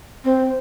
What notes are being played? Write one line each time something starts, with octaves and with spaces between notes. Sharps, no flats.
C4